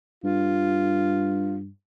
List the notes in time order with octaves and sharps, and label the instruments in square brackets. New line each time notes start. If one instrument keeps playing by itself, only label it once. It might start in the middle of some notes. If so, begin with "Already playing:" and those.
[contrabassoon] G2 [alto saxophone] F4